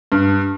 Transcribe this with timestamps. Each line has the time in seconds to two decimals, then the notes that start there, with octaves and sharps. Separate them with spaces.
0.12 G2